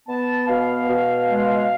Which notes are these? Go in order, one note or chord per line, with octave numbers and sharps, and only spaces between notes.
B3 A5
B2 F5
B2
G#3